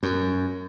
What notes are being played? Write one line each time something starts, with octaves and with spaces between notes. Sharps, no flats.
F#2